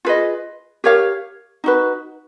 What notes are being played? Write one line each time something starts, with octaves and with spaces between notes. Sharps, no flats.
F4 G#4 B4 D#5
G4 A#4 C#5 F5
D#4 F#4 B4